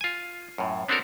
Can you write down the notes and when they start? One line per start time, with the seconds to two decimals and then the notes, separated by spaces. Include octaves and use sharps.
0.01 F4 G#5
0.58 F#2 A2
0.88 B3 C4 D4 F#4 A4 A#4